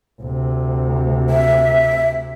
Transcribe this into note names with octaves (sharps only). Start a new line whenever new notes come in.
D2 C3
E5